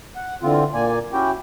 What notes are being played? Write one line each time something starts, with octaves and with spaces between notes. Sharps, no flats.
F#5
D3 E3 C4 F4
A#2 A#3 D5 G#5
C#4 E4 F#4 G4 G5